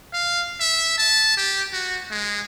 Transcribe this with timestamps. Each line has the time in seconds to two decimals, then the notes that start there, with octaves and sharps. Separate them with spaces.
0.13 F5
0.60 E5
0.98 A5
1.37 G4
1.73 F#4
2.11 G#3